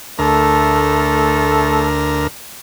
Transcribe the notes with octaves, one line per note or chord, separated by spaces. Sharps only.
D2 A3 A4 A#4